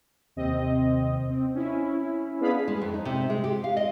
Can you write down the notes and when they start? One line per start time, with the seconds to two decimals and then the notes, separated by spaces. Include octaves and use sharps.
0.36 D#2 C3 C4 D#5
1.29 C4
1.55 C#4 E4
2.41 B3 D4 G#4 F5 B5
2.68 G#3
2.81 F2
2.94 D#4
3.05 C3
3.30 G#3
3.44 G4
3.64 F5
3.77 D#5